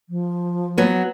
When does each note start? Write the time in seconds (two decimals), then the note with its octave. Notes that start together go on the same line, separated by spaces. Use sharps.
0.09 F3
0.78 F#3 B3